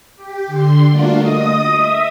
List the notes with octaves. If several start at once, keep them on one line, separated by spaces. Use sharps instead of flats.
G4
D3 C6
G3 A3 A#3 D4 F4 F#4
D#5 D#6
E5